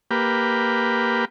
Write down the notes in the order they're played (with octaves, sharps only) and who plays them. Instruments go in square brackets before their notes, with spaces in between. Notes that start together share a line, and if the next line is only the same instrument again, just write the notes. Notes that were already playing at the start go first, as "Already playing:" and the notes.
[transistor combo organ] A#3 G4 B4